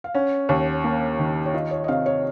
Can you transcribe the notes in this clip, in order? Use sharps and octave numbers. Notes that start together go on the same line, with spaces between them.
F5
C#4 F#5
D#2
A#3
D#3
C#5
F4 D#5
C#5
D#5
C3 F5
C#5